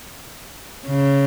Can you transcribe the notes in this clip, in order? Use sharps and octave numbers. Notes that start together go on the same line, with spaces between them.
C#3